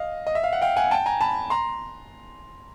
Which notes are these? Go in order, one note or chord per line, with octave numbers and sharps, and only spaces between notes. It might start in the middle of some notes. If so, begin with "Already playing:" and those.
Already playing: D#5 F5
D#5
E5
F5
F#5
F5 G5
F#5 G#5
G5 A5
G#5 A#5
A5 B5
A#5 C6